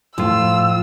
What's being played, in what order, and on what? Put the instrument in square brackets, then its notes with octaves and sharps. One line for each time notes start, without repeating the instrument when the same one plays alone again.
[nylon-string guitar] A2 [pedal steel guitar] F3 F4 [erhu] E6